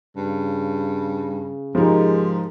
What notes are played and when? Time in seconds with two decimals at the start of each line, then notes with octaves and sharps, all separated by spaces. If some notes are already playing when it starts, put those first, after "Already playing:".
0.16 G2 C#3
1.75 G#2 F3 D#4 G4 G#4 A#4